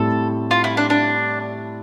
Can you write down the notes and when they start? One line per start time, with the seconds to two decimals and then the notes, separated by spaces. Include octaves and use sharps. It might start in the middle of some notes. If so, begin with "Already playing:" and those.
Already playing: A2 G3 C4 E4 A4
0.51 F4
0.64 E4
0.77 D4
0.90 D4